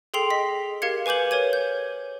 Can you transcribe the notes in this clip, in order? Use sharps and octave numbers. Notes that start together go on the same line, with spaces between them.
G#4 A4 G5 C6 C7 F7
D#5 B6
G4 A#4 F5 G#6 C#7
B4 G#5 D6 G6 F#7
A#4 C#5 G#6 D#7
G6